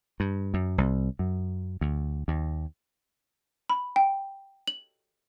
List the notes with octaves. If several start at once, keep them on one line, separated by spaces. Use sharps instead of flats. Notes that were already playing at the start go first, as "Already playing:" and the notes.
G2
F#2
C2
F#2
D2
D#2
B5
G5
F#7